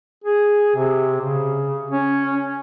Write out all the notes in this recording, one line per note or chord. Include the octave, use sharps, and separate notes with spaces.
G#4
C3
C#3
C#4